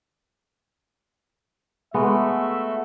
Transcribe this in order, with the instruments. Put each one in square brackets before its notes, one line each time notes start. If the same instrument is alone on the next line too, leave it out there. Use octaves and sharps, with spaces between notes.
[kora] G#3 B3 [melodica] A3 F#4 [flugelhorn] E5